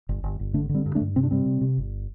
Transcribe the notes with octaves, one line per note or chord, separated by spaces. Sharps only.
G1
G1
G1
D3 A3 D4
D3
G3 C4
G2
A3 D4
G2
C3 C4
D4
C3 G3 C4
C3
C3
G1